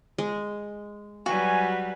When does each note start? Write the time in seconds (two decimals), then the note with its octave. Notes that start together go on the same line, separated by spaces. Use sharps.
0.18 G#3
1.26 F#3 G3 F#4 B4 G#5